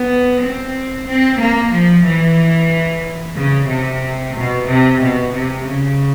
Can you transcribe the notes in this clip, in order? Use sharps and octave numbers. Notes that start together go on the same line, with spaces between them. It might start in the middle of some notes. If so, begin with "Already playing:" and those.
Already playing: B3
C4
C4
A#3
F3
E3
C#3
C3
B2
C3
B2
C3
C#3